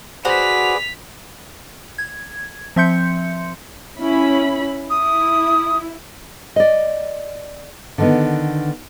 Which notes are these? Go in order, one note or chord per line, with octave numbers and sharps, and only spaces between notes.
F#4 G#4 B4 C5 D5 F#5 B6 F7
G#6
F3 C4 E5 C6 G6 C#7
C#4 E4 B5
E4 D#6
D5 D#5
D3 D#3 B3